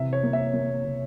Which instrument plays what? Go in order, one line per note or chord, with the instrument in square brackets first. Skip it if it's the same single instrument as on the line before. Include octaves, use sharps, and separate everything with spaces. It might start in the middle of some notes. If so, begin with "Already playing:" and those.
Already playing: [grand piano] C3 E3 E5
C#5
A#3
E5
A#3
C3